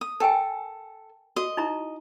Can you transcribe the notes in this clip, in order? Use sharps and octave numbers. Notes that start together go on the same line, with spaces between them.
D#6
A4 A#4 G5 G#5
F#4 D#5
D#4 E4 A#5